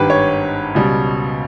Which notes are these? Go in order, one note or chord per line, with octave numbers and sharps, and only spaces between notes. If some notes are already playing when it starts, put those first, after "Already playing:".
Already playing: G#1 G2 D#3 G4 B4
C#5
C#2 B2 G3